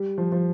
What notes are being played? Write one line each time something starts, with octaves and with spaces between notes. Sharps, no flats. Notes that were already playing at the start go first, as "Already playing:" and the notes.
Already playing: G3
F3
F3